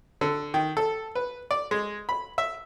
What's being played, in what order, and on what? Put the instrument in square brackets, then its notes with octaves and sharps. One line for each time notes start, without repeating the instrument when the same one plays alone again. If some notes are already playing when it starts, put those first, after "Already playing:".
[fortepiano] D3
D#3
A4
B4
D5
G#3
B5
E5